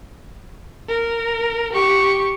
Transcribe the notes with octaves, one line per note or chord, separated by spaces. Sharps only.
A#4
G4 C#6